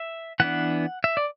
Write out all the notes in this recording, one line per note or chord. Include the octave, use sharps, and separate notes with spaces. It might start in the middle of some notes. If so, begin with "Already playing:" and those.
Already playing: E5
E3 B3 D4 F#5
E5
D5